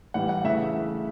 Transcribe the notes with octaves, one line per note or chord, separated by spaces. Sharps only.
A2 E3 G3 F#5
F#5
C#3 E3 A3 E5